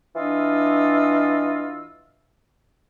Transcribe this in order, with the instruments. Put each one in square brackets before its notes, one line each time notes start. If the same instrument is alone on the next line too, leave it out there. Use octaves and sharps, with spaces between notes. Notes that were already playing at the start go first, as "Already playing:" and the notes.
[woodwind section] E3 D4 F4 D#5 E6